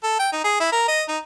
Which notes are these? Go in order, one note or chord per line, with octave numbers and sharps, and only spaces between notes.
A4
G5
D#4
G#4
E4
A#4
D#5
D#4